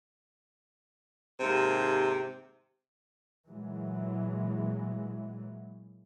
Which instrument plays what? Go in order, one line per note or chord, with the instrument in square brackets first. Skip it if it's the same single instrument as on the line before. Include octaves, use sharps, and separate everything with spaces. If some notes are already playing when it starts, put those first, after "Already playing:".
[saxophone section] D#2 G#2 C3
[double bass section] A#2 E3 F#3 G#3